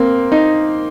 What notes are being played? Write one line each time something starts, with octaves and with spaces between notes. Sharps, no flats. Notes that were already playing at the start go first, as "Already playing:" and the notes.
Already playing: A#3 C4
D#4